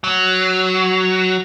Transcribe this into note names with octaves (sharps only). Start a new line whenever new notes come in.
F#3